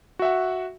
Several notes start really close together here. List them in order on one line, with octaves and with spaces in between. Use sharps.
F#4 E5 F#5